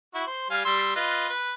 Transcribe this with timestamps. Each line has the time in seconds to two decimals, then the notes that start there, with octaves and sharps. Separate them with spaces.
0.14 E4 F#4
0.27 C5
0.51 G3 F5 G#5
0.65 G3 C6 E6
0.96 F4 B4 D#5
1.30 B4